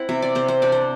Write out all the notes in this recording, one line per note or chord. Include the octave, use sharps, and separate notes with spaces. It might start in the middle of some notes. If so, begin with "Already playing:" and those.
Already playing: C4 E4 F#5
C3 E5
D5
C3 C5
C5
D4 D5
C5